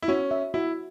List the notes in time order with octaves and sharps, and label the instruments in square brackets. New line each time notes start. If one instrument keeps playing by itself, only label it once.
[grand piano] E4
[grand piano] C#4 [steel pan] F#4
[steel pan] E5
[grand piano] E4 [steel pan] F#4